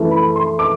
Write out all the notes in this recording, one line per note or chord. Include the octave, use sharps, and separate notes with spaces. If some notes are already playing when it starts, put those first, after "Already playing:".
Already playing: F#2 E3 A3
B5
C6
D6